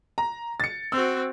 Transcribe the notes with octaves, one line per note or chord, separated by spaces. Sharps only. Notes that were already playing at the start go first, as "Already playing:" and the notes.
A#5
A6 C#7
C4 F#4 E6